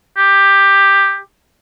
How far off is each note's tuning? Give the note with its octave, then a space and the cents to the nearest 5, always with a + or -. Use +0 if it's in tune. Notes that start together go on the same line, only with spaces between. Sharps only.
G4 +10